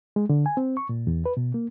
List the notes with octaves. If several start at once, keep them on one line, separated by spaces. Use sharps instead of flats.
G#3
D3
G#5
C4
C#6
A#2
E2
B4
B2
A#3